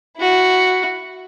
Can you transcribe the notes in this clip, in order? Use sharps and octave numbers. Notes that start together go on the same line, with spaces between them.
E4 F#4